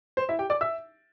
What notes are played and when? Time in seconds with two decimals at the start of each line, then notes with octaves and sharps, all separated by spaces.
0.17 C5
0.29 E4 E5
0.39 G4 G5
0.50 D5 D6
0.61 E5 E6